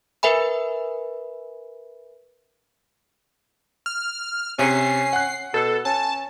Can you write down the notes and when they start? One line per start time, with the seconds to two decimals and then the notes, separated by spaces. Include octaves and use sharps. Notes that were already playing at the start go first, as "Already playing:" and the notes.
0.23 A#4 B4 E5 G#5 B5
3.86 F6
4.59 C3 C#4 C7
5.13 F#5 F#6
5.54 B2 A4
5.85 C#4 A5